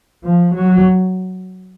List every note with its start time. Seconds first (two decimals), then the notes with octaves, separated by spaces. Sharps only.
0.24 F3
0.55 F#3